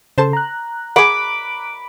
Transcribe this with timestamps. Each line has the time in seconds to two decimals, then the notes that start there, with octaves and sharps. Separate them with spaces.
0.18 C#3 A4 C5 A5 C6 E7
0.33 A#5 F#6
0.96 G#4 F#5 B5 D6